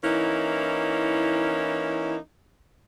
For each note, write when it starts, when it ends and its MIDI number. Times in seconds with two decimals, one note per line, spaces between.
0.03 2.16 52
0.03 2.16 58
0.03 2.16 61
0.03 2.16 63
0.03 2.16 64